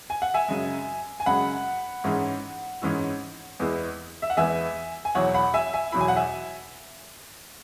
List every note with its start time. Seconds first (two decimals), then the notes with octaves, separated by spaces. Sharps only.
0.10 G#5
0.22 F#5
0.34 E5 G#5
0.48 F#2 C#3 G#3
1.20 G#5
1.26 F#2 C#3 G#3 F#5 B5
2.04 G#2 E3 G#3 C#4 E4
2.82 G#2 E3 G#3 C#4 E4
3.59 E2 E3 G#3 B3 E4
4.22 E5
4.30 F#5
4.37 E2 E3 G#3 B3 E4 E5 G#5
5.05 G#5
5.15 E2 B2 F#3 E4 C#5 F#5
5.34 F#5 B5
5.54 E5 G#5
5.73 E5 G#5
5.92 E2 B2 F#3 E4 B5
6.01 G#5
6.08 F#5
6.16 E5 G#5